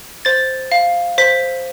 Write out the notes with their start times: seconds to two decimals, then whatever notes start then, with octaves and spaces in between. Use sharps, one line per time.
0.25 C5 A6
0.72 F5
1.18 C5 B6